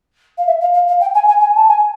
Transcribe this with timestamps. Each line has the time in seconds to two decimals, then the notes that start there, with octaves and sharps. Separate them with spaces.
0.38 F5
0.47 E5
0.61 F5
0.74 F5
0.88 F5
1.01 G5
1.14 G#5
1.28 G#5
1.41 G#5
1.56 A5
1.68 G#5